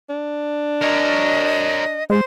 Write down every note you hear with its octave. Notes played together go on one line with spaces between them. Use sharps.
D4
A#4 C#5 D#5
G#3 C5